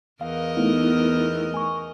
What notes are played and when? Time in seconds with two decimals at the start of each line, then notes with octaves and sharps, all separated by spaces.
0.21 E2 A#4 D#5 F5
0.57 A3 B3 D#4 E4
1.54 G#5 C#6